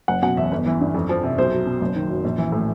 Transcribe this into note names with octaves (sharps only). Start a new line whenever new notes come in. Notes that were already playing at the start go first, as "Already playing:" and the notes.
F#1 F#5
B2 F#5
E2 E5
G1
E3
G2
F2
F3
C3
B1 C5
F#3
B2
F#1
D#3
F#2
A#1
E3
A2